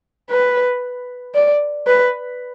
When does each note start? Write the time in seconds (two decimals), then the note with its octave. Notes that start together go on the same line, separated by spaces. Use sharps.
0.30 B4
1.35 D5
1.87 B4